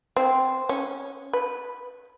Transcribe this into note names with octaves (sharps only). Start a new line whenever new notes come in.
C4
C#4
B4